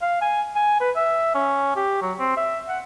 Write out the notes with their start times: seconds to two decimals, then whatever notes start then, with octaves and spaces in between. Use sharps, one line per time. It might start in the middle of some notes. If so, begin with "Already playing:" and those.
0.02 F5
0.21 G#5
0.56 G#5
0.81 B4
0.96 E5
1.35 C#4
1.76 G4
2.02 F#3
2.19 C4
2.37 E5
2.68 F#5